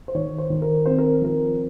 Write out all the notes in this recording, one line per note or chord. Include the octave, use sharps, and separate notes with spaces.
C5
D#3 C#5
C5
D#3
A#4
C4 C5
A#4
F3 A#4